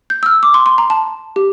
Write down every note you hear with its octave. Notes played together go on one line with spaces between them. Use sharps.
G6
E6
F6
D6
C6
C6
A#5
A5
G4